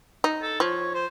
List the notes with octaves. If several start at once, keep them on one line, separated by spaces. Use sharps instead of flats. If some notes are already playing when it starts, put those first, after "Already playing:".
D#4
A4
F3 C#5
C5